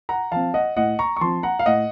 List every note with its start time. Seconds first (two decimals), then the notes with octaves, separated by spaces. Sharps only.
0.09 F#5 A#5
0.32 F3 C4 F5 A5
0.54 D#5 F#5
0.76 A2 D#5 F#5
0.99 A#5 C#6
1.17 C#6
1.21 F3 C4 A5 C6
1.43 F#5 A#5
1.59 F5
1.66 A2 D#5 F#5